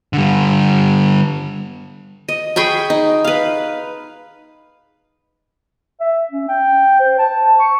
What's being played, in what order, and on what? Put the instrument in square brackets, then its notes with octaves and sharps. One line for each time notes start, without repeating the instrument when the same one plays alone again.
[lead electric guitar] D3 G3
[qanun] D#5
G#4 G5 B5 C#6
D#4
B4 F5
[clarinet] E5
C#4
G5
C5
A5
C#6